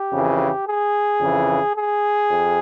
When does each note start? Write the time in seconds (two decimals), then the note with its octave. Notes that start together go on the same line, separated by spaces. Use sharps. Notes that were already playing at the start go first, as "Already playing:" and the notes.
Already playing: G4
0.11 F2 C#3 E3
0.66 G#4
1.20 F2 C#3 E3
1.76 G#4
2.31 F2